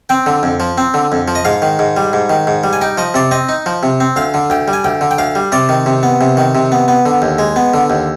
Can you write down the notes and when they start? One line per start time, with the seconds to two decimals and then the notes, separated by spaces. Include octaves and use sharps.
0.09 C4 G5
0.26 D3
0.43 F2
0.60 F3
0.78 C4
0.94 D3
1.12 F2
1.28 F3
1.35 D#5
1.45 G#2 F5
1.62 D#3
1.79 G#2
1.97 G3
2.13 G#2
2.30 D#3
2.47 G#2
2.64 G3
2.73 G#5
2.81 D#4 G5
2.98 F3 D#5
3.14 C3 D5
3.31 C4 D#5
3.49 D#4
3.66 F3
3.83 C3
4.00 C4
4.16 D2 F5
4.34 D3
4.50 D2 G5
4.68 G3
4.73 G#5
4.84 D2 G5
5.01 D3
5.11 G5
5.18 D2 F5
5.35 G3
5.52 C3 D5
5.69 D#3
5.86 C3
6.03 B3
6.21 C3
6.37 D#3
6.55 C3
6.72 B3
6.88 B3
7.06 D3
7.22 D#2
7.39 G#3
7.56 B3
7.74 D3
7.90 D#2